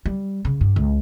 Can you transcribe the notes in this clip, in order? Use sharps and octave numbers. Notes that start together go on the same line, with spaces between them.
G3
C#3
G2
C#2